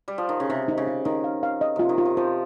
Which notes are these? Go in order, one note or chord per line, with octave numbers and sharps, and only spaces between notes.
G3
F3
D#3
C#3
C3 D#4
D#4
C#3
D#4
D#3 D#4
F5
F5
D#5
C3 F4
D#3
F4
D#3
F3 C5